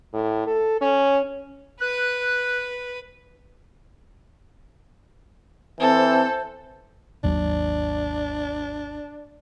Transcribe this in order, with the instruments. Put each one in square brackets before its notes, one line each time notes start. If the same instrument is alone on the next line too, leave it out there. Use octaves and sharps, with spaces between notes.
[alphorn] A2
A4
C#4
[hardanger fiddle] B4 [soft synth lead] F#6
[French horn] E3 [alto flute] C4 [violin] A4 [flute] C5
[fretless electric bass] G#1 D#2 F#3 [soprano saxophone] D4